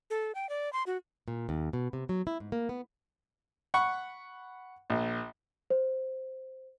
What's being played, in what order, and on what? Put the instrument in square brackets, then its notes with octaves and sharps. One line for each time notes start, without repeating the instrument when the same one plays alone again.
[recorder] A4
G5
D5
C6
F#4
[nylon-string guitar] A#2
D#2
B2
C3
F#3
E4
G#2
A#3
B3
[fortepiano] F#5 B5 C#6
A#1
[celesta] C5